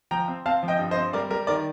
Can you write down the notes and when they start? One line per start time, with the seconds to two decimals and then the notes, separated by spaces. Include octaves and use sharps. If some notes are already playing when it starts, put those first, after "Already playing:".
0.11 F3 G5 A#5
0.28 C4
0.46 C4 F5 A5
0.63 F3
0.68 D#5 G5
0.79 G2
0.91 C5 D#5
0.96 C4
1.13 G3 A#4 D5
1.30 G3 A#4
1.47 D#3 A#4 D5